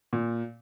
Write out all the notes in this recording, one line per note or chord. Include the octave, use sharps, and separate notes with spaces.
A#2